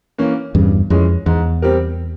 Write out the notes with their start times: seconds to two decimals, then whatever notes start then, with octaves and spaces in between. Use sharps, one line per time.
0.18 E3 A#3 C#4
0.54 E2 G2 C#3
0.90 F2 E3 G#3 C#4
1.26 E2 G#2
1.62 G3 C4 G4 A#4